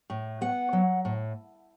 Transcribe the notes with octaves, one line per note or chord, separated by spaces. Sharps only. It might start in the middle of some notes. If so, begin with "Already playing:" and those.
A2
B3 F#5
F#3
A2